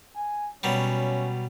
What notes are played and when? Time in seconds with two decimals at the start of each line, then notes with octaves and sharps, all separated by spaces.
0.16 G#5
0.63 B2 F#3 G3 C#4